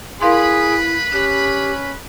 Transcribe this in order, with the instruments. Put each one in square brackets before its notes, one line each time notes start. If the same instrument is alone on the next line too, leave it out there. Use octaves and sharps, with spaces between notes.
[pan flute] E4 [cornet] G#4 [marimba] A#4 F5 C6 [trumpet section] B4 B5
[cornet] C#4 [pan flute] G4 [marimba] F#6